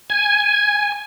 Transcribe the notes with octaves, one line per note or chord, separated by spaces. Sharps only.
G#5